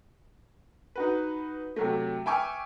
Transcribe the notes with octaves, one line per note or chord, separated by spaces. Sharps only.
D#4 F#4 B4
C3 F#3 A3
E5 G5 G#5 C#6 D6 F6